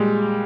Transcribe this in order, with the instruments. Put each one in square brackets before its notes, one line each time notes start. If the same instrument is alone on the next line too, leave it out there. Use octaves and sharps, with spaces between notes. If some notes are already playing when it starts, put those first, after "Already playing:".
Already playing: [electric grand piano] A#2 G3 G#3